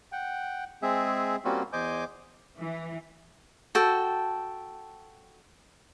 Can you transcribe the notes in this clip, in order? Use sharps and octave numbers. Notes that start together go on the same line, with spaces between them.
F#5 G5
G#3 C4 G#4 E5
G3 A#3 C4 C#4 F4 F#4
E2 C5 D#5 G#5 D6 G6
E3
F#4 A4 G5 A5